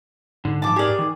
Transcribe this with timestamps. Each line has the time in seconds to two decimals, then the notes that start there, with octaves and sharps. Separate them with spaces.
0.45 G#2 D3
0.62 A#2 F3 A5 D6
0.76 G4 G#4 A#4 D5
0.99 D#3